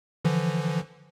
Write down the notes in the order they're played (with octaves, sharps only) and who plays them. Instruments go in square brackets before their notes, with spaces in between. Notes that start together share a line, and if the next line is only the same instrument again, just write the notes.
[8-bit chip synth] D3 E3 F3